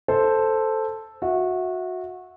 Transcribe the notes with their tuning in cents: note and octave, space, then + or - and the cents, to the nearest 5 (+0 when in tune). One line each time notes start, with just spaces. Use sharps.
A4 +0 C5 +0
F#4 -20 E5 -15